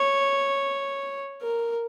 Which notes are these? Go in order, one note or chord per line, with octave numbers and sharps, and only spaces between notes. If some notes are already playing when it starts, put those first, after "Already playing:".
Already playing: C#5
A#4